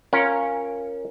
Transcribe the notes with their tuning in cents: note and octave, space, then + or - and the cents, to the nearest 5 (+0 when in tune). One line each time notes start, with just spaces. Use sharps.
C#4 -10 F4 +0 A#4 +0